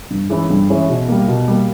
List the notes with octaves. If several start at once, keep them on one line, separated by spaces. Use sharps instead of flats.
G2
E3 G#3 C#4 E4
G2
E3 G#3 C#4 E4
B2
G3 A#3
B2
G3 A#3